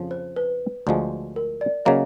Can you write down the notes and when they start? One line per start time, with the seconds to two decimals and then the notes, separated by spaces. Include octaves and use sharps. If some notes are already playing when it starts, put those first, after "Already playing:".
Already playing: F2 C#3 F3
0.11 C5
0.36 B4
0.87 D2 D3 F3 G#3
1.36 A#4
1.61 D5
1.85 C#3 F#3 A#3 D#5